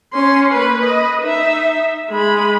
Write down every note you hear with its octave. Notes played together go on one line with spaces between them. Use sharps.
C#4 C6
A#3 B4
B4 D#5
D#4 E5
G#3 B5